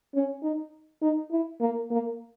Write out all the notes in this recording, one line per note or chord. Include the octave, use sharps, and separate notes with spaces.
C#4
D#4
D#4
E4
A#3
A#3